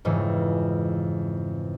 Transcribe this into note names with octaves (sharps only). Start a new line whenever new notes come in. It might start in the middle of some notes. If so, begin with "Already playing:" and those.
F2 G#2 C#3 E3